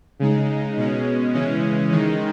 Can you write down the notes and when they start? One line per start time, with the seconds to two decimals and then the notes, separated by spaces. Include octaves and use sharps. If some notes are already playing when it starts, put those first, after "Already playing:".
0.20 C#3 G#3 D#4
0.77 B2 G#3 C#4
1.34 C#3 E3 G#3 C#4
1.91 D#3 G#3 D#4